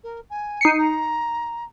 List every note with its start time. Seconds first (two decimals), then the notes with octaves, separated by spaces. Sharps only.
0.03 A#4
0.30 G#5
0.61 D#4 C7 C#7
0.79 A#5